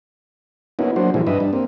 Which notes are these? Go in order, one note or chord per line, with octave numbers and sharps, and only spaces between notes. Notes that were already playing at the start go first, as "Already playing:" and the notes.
A#3 B3 C#4 D#4 E4 F#4
F#3 A#3 D4 F#4 C5
A#2 E3 F3 G3 E4 G#4
G2 D4 B4 D#5 E5
G3 D4
A#3 C4